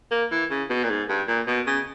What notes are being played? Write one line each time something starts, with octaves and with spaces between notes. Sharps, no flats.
A#3
E3
C#3
B2
A#2
G#2
G2
A#2
B2
C#3